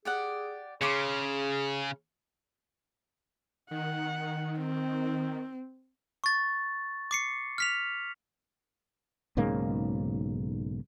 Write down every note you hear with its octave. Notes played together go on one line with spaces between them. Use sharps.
G4 G#4 D5 F#5
C#3 G#4 C#5 C6 D6
D#3 F#5
C4
C#6 A6
D6 C7 C#7
F6 B6 F7
B1 G#2 C#3 A#3